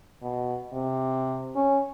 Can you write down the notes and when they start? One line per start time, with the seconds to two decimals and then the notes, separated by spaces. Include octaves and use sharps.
0.22 B2
0.73 C3
1.56 C#4